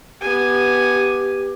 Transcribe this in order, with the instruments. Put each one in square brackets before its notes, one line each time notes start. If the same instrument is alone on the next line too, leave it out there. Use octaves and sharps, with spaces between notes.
[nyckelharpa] B3 G#5 [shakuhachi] G4